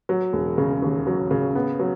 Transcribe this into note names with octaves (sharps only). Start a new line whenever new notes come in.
F#3
E1
C#3
D#2
F#3
C#3
B3
F#3